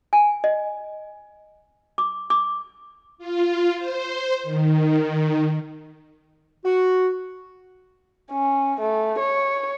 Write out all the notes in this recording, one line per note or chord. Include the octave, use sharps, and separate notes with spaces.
G#5
D#5
D6
D6
F4
C5
D#3
F#4
C#4
A3
C#5